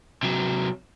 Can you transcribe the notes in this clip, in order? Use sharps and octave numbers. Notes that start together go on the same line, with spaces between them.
C3 F#3